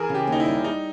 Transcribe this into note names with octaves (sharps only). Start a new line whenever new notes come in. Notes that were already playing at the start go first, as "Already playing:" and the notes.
Already playing: E3 G#4 A#4
C#3
G4
D#2 D#4
E4
G3
G3 D#4